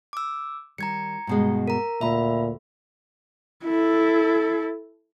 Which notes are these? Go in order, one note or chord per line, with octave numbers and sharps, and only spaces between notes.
D6 E6
D#3 G3 A#5 G#6 C#7
G2 B2 G#3
A#4 A#5
D2 A#2 E5 B5
E4 A4